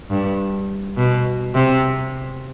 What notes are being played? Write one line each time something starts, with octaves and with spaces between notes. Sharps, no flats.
G2
B2
C3